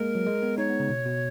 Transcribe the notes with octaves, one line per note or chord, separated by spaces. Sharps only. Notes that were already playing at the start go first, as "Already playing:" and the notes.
Already playing: G#3 A#3 A#4
F#3
G#3
B3
D#4 C#5
B3
C#3
B2
B2